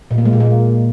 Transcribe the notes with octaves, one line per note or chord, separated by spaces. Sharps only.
A#2
A#3
G#3
A#2
A#3